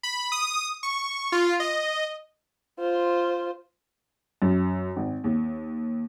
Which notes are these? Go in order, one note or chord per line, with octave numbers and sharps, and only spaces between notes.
B5
D#6
C#6
F4
D#5
F4 C5
F#2
G#1
D#2